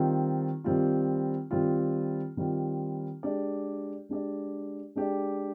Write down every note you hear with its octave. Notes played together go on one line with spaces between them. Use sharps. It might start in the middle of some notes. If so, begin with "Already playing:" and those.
Already playing: D#3 G3 C4 F4
D#3 G3 C4 F4
D#3 G3 C4 F4
D#3 G3 C4 F4
G#3 D4 G4 D5
G#3 D4 G4 D5
G#3 D4 G4 D5